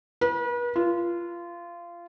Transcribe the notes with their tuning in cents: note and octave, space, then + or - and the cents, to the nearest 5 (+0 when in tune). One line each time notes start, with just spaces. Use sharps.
B4 -40
F4 -20